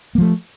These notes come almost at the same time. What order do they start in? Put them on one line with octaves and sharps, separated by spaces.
A#3 F3 A3